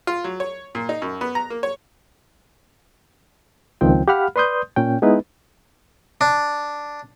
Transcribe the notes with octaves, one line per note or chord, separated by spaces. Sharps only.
F4
F#3
C#5
A#2
D#4
F#2
B3
A#5
A#3
C#5
C#2 D#3 F3 C4 G5
G4 F5 F#5 B5 F6
B4 D5 C6 D#6 G6
A#2 C#4 G5
G#3 B3 D#4 E4 B4
D4